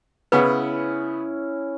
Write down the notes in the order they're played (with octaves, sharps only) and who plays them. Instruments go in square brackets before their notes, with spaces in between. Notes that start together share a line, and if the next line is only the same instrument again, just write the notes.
[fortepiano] C#3 B3 [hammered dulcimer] C#4 E4 [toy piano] B4 F#5